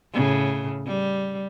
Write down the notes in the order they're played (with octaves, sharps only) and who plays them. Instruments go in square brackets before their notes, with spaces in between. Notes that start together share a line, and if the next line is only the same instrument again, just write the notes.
[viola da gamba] A2 C#3
G3